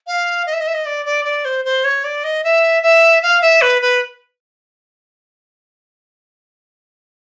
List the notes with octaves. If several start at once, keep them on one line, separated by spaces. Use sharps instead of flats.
F5
D#5
E5
D#5
E5
D#5
D5
D5
D5
C5
C5
C#5
D5
D#5
E5
E5
F5
E5
B4
B4